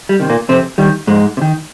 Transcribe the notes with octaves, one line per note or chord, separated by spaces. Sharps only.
G3
C3 D#3
A#2 A#3
F2 C3 C4
D#3 G3
F2 G#2 G#3
C3
D#3